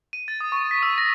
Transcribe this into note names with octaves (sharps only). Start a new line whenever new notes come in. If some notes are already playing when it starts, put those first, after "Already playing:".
D#7
A6
D#6
C#6
B6
E6
A#6